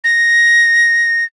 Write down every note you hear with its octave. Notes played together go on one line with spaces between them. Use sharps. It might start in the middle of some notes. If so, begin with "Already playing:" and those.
A#6